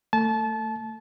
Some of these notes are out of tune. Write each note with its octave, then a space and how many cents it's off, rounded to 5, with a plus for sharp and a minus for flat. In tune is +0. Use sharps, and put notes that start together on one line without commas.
A3 +25 A5 -25